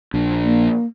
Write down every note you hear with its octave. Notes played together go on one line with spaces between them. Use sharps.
A#1 D4
A#3